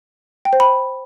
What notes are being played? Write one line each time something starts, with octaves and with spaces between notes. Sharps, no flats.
G5
C5
B5